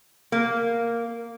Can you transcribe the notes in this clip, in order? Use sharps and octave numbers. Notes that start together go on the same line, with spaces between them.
A#3